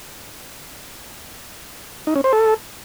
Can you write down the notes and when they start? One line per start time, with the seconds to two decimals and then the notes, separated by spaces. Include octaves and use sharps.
2.07 D#4
2.16 C#4
2.24 C5
2.33 A4